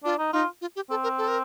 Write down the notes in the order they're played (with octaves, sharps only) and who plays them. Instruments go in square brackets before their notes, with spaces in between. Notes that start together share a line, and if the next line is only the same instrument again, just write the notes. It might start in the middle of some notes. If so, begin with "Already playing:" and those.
[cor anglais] D4 [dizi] F4
[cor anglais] D#4
[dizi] D#4 [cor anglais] F4
[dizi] F4
G4
[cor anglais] C4 [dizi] A4
[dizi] A#4
A4
A#4